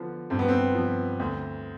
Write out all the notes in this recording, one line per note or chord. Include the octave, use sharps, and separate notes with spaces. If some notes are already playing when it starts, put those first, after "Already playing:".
Already playing: D3 F3 B3
G2 C4
B3
C4
F3
D2